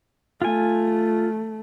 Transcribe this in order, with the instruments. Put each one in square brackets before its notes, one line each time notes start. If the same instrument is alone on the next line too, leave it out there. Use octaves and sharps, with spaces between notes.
[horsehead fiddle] A3 [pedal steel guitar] F4 G#5